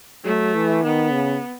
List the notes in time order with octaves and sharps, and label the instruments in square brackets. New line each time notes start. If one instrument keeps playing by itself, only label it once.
[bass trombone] F#3 [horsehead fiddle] A3
[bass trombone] E3
[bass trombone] D#3 [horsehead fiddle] B3
[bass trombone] C#3